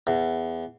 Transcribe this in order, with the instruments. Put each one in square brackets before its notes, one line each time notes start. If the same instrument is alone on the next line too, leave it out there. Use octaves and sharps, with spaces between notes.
[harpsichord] E2